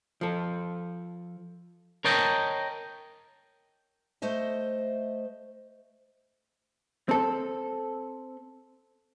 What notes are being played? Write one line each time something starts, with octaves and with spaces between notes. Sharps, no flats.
F3 A4
A#4 C#5 D#5 G5 A5
A3 C5 D#5 E5
C4 A4